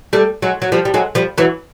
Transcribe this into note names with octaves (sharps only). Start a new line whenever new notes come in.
G3 A3
F#3 G#3
F#3
F3 G3
G3
F#3 G#3
F3 G3
E3 F#3